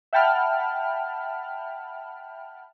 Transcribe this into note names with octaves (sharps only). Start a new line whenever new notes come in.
E5 F#5 G5 A5 B5 F6